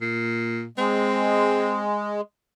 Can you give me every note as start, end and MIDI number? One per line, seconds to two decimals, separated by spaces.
0.01 0.66 46
0.78 2.21 56
0.78 1.85 60